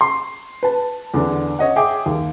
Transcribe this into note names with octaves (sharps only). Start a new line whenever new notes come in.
C6
B4 A5
E2 D3 D4
C#5 D#5 F#5
G#4 E5 G5 D6
D#2